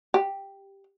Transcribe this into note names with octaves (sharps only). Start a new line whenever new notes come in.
G4